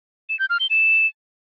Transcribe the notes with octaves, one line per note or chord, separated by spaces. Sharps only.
E7
G6
F6
G7
E7